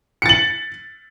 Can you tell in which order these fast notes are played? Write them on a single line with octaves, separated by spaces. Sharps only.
C#7 A6 F#7